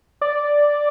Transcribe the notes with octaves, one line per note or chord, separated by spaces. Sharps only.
D5